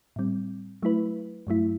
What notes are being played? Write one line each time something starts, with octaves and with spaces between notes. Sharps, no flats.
A2 G3 C4
F#3 A3 E4 B4
G2 F#3 A3 E4